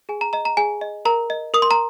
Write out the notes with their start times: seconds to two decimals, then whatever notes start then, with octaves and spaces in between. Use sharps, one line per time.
0.09 G#4 G#5
0.21 A#5
0.33 D#5 A#5
0.45 A#5
0.57 G#4 G#5
0.81 D#5
1.05 A#4 A#5
1.30 D#5
1.54 A#4 D#6
1.62 C6
1.71 A#5